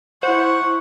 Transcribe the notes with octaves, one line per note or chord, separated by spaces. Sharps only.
E4 C5 F#5 C#6